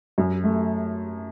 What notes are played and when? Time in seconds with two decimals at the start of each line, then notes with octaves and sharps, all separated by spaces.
0.18 F#2
0.44 A3